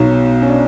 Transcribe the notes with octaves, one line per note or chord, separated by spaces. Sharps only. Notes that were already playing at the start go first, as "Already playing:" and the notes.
Already playing: B1 B2 F#3 D#4
C#4
D4